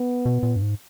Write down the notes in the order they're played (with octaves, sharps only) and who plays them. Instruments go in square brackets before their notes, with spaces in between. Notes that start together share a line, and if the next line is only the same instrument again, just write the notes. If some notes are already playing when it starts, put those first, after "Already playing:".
Already playing: [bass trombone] B3
[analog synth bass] B2
A#2
G2
G#2